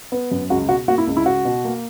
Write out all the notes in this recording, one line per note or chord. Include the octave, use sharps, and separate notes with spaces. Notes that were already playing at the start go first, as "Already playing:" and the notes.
B3
F#2
C#2 F#4
B2 F#4
A#3 F#4
E4
C#2
E4
C#2 F#4
B2
A#3